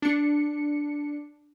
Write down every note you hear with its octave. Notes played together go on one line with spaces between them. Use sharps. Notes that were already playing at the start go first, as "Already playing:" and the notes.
D4 C#7